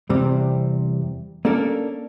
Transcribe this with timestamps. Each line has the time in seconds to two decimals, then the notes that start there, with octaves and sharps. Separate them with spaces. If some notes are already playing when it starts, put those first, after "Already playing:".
0.09 E2 C3 G3 C4
1.45 A#3 C#4 D4 A4 A#4